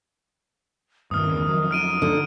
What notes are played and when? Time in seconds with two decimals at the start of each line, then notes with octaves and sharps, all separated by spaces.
1.11 G2 C3 D#3 D#6 F6
1.27 E2 C#3
1.46 F2 F#3
1.71 D#4 F6 D7 D#7
2.02 D3 D#4